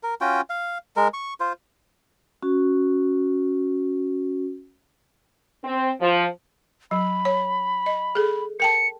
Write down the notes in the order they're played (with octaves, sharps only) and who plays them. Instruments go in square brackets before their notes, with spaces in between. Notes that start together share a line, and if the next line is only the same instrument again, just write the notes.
[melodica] A#4
C#4 F4 F#4 G5
F5
G#3 A#4
C#6
F4 C5
[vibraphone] C#4 F#4
[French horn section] C4
F3
[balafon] F#3 [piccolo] B5
[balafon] C#5
D#5
G#4 A4
[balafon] A#4 G5 A5 [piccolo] C#7